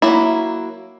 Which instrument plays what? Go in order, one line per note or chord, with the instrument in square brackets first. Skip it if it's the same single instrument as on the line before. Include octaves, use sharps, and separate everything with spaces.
[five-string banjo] F#3 A#3 E4